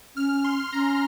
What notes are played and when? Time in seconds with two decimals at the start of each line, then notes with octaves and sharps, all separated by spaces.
0.16 C#4 F6
0.44 C6
0.72 C#4 A#5